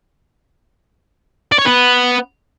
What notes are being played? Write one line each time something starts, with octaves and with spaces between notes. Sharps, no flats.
D5
C#5
B3